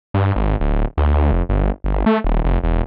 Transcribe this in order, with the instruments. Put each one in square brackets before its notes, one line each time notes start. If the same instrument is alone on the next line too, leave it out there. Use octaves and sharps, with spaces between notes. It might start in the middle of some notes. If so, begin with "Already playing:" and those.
[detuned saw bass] G2
G#1
D1
D2
F1
G1
G1
A3
D#1
F1
E1